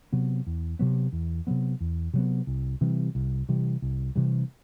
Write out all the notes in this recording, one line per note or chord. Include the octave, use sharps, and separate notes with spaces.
C3 F#3 B3
E2
C3 F#3 B3
E2
C3 F#3 B3
E2
C3 F#3 B3
C2
C3 E3 G3
C2
C3 E3 G3
C2
C3 E3 G3